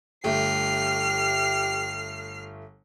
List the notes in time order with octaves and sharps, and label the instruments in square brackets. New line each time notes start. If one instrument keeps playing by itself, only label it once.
[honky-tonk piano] G1 A3 [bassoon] G4 [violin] F6 C7